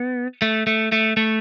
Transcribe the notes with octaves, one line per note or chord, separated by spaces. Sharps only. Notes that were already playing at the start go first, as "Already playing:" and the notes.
Already playing: B3
A3
A3
A3
A3